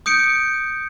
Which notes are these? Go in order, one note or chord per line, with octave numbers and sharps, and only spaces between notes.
D#6 G6 C#7 D7